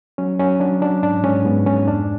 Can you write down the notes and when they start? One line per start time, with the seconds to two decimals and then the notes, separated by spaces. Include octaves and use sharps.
0.18 F#3 C#4
0.39 F#3 C#4
0.60 F#3 D4
0.81 F#3 D4
1.02 G#2 D4
1.24 G#2 C#4
1.44 G#2 B3
1.66 G#2 C#4
1.87 F2 D4